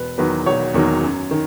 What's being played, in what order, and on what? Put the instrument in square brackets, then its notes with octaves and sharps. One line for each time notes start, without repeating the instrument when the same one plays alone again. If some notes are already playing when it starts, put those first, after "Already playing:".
Already playing: [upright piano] E1 B4
E2 D#3 F#3 B4
E1 C#5
E2 D#3 F#3
F#2
D#3